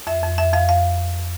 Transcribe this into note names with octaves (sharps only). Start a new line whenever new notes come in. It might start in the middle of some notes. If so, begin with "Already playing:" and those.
F2 E5
F2
F2 E5
F2 F5
F2 F5